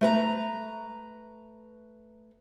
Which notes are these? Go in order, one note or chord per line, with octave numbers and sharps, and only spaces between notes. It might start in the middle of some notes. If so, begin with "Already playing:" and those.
A3 B4 A#5